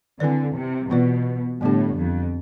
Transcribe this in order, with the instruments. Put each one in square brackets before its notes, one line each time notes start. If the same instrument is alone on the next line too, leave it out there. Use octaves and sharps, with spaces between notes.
[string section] D3 [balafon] C4 E4 B4 D5
[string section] C3
[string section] B2 [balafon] E3 B3 F4 B4 D5
[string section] A2 [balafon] D3 G3 B3 D4 G4
[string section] F2